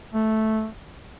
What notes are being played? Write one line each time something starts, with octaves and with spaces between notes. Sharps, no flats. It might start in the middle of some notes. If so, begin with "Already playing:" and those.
A3